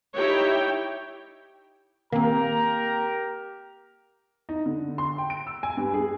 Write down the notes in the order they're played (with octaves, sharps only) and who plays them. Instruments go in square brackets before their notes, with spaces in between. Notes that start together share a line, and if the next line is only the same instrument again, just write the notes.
[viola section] D#4 E4 G4 C#5 G5
[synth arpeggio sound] D#3 C4 [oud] A#3 [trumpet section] G4 A#4 A#5
[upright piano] D#4
D3
C6
G5
D7
E6
G#5
G2
G#4